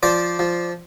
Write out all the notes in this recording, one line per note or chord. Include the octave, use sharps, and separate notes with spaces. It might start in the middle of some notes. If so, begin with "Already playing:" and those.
F3 C5 D5
F3